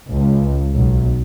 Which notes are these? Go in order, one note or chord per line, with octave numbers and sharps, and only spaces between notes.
C#2
B1